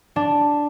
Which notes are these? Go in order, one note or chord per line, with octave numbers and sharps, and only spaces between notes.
D4